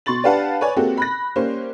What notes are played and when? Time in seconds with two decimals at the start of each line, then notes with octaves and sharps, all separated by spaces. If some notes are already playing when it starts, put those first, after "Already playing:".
0.06 B2 C6 C#6 A6 F#7
0.24 D4 G4 B4 F5 F#5 A5
0.61 B4 C#5 D5 G#5
0.76 G#3 A#3 C4 F#4 G4 A4
0.97 B5 F#6 A#6
1.36 G3 A#3 C#4 C5